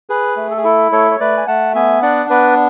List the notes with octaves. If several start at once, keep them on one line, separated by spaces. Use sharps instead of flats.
G#4 B4
A3
A4
G#4
E4 A4
A3 A4 C#5
C#5
A3 B4 D5
G#5
A3 F#5 A5
B3 E5 G#5
D4 D5 F#5
B3 B4 D5